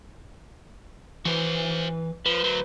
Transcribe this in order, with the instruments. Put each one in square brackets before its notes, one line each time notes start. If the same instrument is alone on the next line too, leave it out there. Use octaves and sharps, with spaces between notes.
[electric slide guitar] E3 B4 [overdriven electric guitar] F#4 C5
[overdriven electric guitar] F3 [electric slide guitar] B4 C5
[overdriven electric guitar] D2 F#3